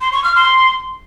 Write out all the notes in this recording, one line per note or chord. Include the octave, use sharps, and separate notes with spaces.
C6
C#6
F6
C6